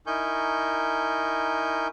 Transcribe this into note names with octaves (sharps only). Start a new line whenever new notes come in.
D#4 E4 A#4 G#5 C#6 G6